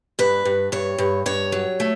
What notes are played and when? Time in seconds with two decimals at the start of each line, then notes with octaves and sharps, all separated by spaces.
0.19 G2 B4
0.45 G2
0.72 G2 C#5
0.98 G2
1.26 G2 C#5
1.52 F#3
1.80 A3